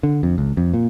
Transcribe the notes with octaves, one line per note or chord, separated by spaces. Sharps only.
D3
F2
C#2
F2
A#2